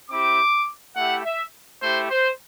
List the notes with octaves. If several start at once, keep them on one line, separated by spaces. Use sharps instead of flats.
C4 E4 G4 D6
A3 E4 G4 F#5
E5
A3 E4 G4 C5
C5